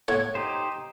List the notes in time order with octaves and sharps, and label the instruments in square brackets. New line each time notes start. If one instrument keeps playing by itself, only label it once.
[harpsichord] A2 F#5 [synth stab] C#5 G#6
[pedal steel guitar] D#4 G4 C5